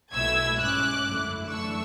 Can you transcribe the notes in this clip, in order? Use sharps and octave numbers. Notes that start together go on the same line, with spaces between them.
B1 B2 A3 E4 E6 G#6
G#2 G#3 C#4 D6 F#6
F#2 D3 A3 E4
F#2 E3 A3 D4 C#6 E6